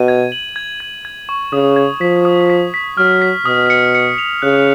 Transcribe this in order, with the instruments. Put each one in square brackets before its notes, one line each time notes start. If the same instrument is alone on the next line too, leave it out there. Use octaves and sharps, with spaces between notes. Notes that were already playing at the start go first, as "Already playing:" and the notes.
Already playing: [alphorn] B2 [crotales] D#7
[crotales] G#6
F#7
G#6
G#6
G#6
C#6
[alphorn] C#3 [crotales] D#6
[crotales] G#6
[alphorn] F3 [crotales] B6
[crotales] D#6
B6
B6
[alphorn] F#3 [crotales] F6
[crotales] B6
[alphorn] B2 [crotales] D#6
[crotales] C#7
C#7
F7
[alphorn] C#3 [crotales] F#6